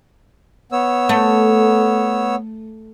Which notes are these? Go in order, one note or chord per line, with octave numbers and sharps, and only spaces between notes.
B3 C#5 E6
A3